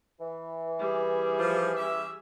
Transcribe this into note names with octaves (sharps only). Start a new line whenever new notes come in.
E3
G3 G#4
F3
C#4 G4 E5